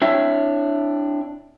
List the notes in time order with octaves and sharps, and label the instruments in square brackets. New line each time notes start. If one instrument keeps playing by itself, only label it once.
[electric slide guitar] C4 D4 E4 C#5 E5